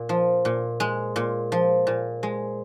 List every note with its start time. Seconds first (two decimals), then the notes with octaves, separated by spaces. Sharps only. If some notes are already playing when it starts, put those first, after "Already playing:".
Already playing: A#2
0.09 F3
0.45 A#2
0.80 G#3
1.16 A#2
1.52 F3
1.87 A#2
2.23 G#3